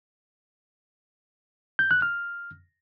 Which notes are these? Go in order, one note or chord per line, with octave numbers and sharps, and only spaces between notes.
G6
F#6
F6